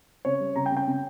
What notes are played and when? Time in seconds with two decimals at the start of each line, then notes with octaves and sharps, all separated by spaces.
0.25 C#3 C#5
0.40 G3
0.56 C#3 A#5
0.66 G5
0.71 C#3
0.77 G5
0.87 C#3